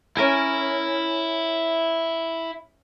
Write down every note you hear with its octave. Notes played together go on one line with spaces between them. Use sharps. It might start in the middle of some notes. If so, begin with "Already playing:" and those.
C#4 E4 A#4 G#5